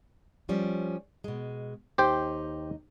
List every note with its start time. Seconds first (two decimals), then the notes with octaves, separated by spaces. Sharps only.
0.49 F3 G3 C#4
1.24 B2 G#3
1.98 D#2 D#4 G4 C5 G5